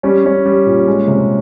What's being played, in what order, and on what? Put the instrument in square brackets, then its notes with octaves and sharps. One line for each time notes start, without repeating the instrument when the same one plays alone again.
[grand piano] G3 C#4
G3 C#4
G3
A#2
G#3
C3